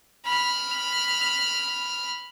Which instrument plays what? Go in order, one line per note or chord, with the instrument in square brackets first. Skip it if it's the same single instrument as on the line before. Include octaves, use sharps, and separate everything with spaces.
[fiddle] B5 F6